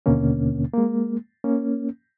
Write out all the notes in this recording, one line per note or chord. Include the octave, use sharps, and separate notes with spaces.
D#2 B2 D3 A#3 C#4
G#3 A#3
A#3 C#4